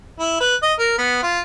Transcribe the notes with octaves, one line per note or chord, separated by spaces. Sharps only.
E4
B4
D#5
A#4
B3
F4